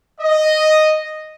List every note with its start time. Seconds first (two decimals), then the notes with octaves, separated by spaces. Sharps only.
0.20 D#5